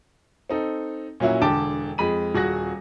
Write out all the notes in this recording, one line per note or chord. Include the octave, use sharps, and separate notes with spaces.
C4 D#4 A4
A#2 F#3 C#4 E4 F#4
E1 D3 G5 A5 D6
F2 G#3 B5 D#7
D#1 F#4 G#4 F#6 A#6